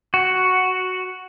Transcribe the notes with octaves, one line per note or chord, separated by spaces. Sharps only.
F#4